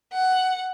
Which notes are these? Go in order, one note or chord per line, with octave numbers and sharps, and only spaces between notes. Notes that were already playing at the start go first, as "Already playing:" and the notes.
F#5